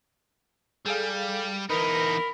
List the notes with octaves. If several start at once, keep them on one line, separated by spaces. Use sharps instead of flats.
G3 G#4 A4 F5
E2 D#4 A#4 B4 B5